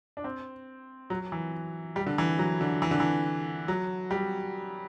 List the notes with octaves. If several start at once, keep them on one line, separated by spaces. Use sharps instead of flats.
D4
C4
F#3
E3
G3
D3
E3
F#3
D3
E3
D3
E3
F#3
G3